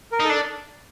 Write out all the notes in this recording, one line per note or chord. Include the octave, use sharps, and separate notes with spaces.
A#4
D#4 A4
D4